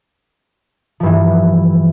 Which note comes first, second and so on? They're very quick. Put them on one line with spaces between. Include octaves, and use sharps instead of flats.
F3 G2 E3